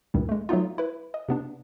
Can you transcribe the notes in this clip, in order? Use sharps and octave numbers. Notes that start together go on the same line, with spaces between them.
C#2 G2 A#2 D#3 G3
G#3 A3
F#3 A3 B3 D#4 F4
E4 B4
D#5
C3 B3 D4